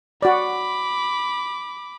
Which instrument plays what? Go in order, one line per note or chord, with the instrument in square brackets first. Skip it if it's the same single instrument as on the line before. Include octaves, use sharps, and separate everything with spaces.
[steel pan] F#4 D5 [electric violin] B5 D6